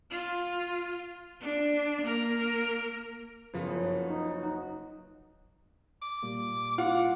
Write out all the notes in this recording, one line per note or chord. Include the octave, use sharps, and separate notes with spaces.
F4
D4
A#3 A#4
F#2 C#3 F3 B3
F#1
D#4
D#4 F#4
D6
A#2 G3 A#3
F4 F#5